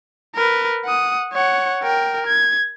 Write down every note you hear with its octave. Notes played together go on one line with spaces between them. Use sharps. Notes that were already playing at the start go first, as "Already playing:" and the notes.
A#4 B4
F#5 D#6
C#5 F#5
A#4 G5
G#6